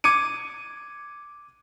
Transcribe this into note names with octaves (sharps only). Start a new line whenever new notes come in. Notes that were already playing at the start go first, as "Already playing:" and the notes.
D6 G#6 C#7 D#7